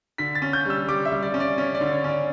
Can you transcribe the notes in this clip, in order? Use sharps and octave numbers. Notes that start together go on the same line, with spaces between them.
D3 B6
A6
C#4
G6
G3 E6
G3 D6
E5
G3
D5
C#4
D5
C#4 C#5
D5
D3
C#5
C#4 D5